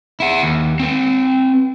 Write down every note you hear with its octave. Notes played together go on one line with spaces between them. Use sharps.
E4 F#5
D#2
C4 B4